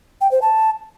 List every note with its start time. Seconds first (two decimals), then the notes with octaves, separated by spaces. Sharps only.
0.21 G5
0.31 C5
0.42 A5